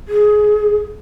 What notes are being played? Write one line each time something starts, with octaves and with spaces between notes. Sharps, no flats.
G#4